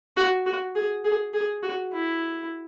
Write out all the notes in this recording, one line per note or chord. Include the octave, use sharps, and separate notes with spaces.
F#4
F#4
G#4
G#4
G#4
F#4
E4